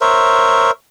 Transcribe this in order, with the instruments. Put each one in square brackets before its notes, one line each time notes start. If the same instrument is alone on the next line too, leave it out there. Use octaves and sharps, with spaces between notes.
[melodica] A#4 C5 C#5 E5